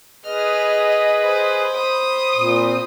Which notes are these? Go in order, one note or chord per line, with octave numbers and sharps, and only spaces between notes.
G#4 B4 D#5 F6
C5 B5
D#6
A#2 C4